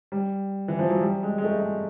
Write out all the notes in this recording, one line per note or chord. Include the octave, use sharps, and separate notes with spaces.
G3
E3
F3
F#3
G3
G#3
G#3
A3
G#3